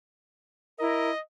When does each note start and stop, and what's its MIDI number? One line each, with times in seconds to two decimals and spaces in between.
0.80 1.09 64
0.80 1.09 70
0.80 1.20 75